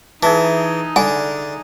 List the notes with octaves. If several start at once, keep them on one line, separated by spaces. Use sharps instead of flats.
E3 D#4 G#4 E5 A5
D3 G#5